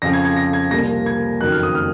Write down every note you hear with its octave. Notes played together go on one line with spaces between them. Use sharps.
F2 C#3 F3 A#6
G#6
G#6
A#6
G#6
C2 A#2 F3 A#6
G#6
F#1 F2 D#3 F#3 F#6
F6
D#6
F6